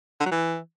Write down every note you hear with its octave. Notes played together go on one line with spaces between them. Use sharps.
D3
F#3
E3